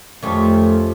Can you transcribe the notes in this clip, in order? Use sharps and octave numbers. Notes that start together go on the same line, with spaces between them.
F2 D#3 F3 G3 A3 C#4